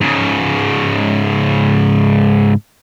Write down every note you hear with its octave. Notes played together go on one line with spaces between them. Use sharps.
G#2 C#3